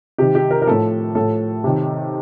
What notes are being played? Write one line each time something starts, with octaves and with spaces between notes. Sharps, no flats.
C3 D#3 G4
G4
A#4
A#4
A2 F3 A4
A2 F3 A4
C3 D#3